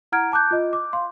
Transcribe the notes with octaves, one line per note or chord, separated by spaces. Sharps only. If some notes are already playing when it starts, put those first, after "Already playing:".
E4 F#5 A#5 F6 G#6 D7
A5 D6 F#6 G6
F4 D#5
D6
F5 C6